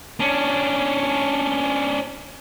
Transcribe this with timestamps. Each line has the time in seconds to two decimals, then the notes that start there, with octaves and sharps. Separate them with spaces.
0.20 C#4 D4